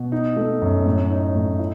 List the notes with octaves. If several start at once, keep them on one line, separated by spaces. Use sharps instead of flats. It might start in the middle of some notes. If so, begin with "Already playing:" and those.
Already playing: B2
D#4
A3
F#2
A2
D#4
A2
E4